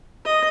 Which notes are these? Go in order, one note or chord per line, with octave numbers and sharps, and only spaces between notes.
D#5